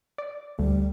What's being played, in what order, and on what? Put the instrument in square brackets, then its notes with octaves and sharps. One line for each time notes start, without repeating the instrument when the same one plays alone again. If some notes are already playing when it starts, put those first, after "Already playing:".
[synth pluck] D5
[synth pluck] D2 [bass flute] G3